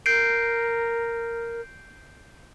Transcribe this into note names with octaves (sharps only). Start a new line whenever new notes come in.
A#4 G6 C7 D7